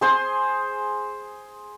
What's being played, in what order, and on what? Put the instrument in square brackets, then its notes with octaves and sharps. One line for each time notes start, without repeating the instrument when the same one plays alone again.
[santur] G#4 C5 C6